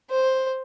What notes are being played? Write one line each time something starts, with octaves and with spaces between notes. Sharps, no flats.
C5